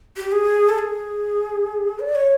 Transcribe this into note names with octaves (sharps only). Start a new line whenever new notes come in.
G4
G#4
A4
G#4
D5
C#5